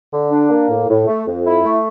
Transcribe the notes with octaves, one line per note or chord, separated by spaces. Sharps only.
D3
D4
A#3
A2
A2
A3
F2
E4
A3